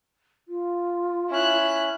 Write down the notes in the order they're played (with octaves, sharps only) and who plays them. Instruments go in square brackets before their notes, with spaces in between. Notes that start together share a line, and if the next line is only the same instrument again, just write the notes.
[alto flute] F4
[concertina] C#4 [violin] E4 F#6